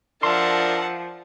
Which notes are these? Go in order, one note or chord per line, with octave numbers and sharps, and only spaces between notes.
F3 D4 A#4 E5 F#5 A5 C6